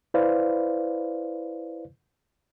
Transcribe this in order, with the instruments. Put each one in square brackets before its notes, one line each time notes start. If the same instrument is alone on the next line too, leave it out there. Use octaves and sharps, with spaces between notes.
[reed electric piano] E4 B4 C5 D5 F5